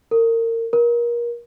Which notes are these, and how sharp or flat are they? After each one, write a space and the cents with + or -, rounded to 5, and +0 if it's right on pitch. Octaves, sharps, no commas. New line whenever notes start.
A#4 -30
A#4 +30